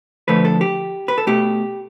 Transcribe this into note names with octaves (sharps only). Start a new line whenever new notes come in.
D3 F3 A3 B4
A4
G4
B4
A4
B2 A3 G4